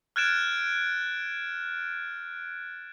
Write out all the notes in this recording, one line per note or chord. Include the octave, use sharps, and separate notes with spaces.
F6 F#6 G#6 A6 D7 E7